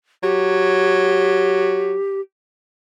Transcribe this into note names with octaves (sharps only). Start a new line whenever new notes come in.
F#3 G4